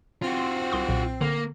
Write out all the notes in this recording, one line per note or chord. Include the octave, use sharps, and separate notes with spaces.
C4 F4 F#4
C6
C2 C6 D#6
B1 A#2
D3 A#3